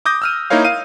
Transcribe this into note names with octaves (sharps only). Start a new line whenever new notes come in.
D6 D#6 G6 A#6
E6 F6 D#7
A#3 D#4 E4 A#4 C#5 F5
F5 D#7